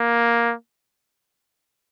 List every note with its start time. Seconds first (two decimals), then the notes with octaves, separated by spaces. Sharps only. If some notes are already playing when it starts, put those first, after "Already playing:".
Already playing: A#3